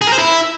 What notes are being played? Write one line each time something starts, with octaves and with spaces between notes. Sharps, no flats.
G#4
A#4
C5
E4